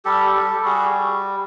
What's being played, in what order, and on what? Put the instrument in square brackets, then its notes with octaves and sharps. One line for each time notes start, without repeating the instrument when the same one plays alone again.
[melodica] G3 G4 A4
G3 G4 A4
A4
G3 F#4 G#4